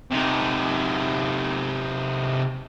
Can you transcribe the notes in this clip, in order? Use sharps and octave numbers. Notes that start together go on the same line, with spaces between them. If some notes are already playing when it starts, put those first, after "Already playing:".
C3 D#4